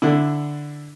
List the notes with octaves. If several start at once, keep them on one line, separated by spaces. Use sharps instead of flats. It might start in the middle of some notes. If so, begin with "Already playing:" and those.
D3 D4 E4